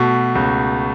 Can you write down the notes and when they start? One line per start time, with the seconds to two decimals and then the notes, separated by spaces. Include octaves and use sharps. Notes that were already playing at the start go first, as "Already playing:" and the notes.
Already playing: B2 A3
0.35 C#2